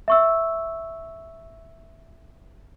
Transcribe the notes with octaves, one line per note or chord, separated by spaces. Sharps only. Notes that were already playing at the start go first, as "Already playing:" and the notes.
E5 C#6 E6